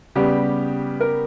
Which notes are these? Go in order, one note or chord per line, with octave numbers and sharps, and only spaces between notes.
C#3 G3 B3 G4
A#4